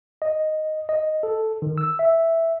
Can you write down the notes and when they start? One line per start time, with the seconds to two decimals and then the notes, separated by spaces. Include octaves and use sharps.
0.22 D#5
0.89 D#5
1.23 A4
1.62 D#3
1.78 E6
1.99 E5